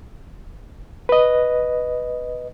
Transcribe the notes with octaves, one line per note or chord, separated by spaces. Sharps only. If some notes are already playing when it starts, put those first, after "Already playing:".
B4 D#5